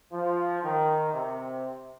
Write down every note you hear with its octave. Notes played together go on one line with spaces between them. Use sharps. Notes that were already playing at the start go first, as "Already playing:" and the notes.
F3
D#3
C3